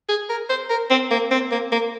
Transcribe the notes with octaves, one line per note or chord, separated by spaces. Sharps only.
G#4
A#4
C5
A#4
C4
A#3
C4
A#3
A#3